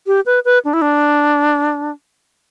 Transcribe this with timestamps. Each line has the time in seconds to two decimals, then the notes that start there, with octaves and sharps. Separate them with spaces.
0.07 G4
0.26 B4
0.45 B4
0.65 D4
0.73 E4
0.82 D4